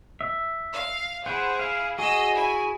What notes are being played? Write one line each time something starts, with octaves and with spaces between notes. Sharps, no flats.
E5
F5
E4 G#4 C5 F#5
F5
F#4 G#4 D#5 E6
E4 G#5